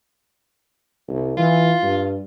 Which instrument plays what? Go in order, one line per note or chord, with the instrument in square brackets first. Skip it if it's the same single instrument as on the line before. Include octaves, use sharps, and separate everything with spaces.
[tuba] C2
[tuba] E3 [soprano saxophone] F4
[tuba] G2